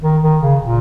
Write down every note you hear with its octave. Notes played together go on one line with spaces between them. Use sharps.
D#3
D#3
C#3
A#2